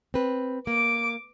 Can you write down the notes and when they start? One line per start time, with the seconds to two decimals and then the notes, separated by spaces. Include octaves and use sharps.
0.14 C4 B4
0.67 A#3 D6